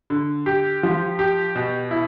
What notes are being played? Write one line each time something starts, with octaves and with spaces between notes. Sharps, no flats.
D3
G4
F3
G4
B2
E4